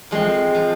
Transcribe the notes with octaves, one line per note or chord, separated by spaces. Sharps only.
F3 G#3 C4
F3